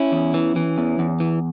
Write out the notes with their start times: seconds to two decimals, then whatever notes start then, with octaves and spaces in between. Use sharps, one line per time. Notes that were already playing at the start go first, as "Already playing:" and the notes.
Already playing: C#4 E4
0.12 E2
0.34 E3
0.56 E3
0.78 E2
0.99 E2
1.20 E3